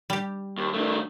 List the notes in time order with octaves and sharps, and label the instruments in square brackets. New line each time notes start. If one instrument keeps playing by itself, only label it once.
[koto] G3 G4
[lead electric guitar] D#2
D#3 A3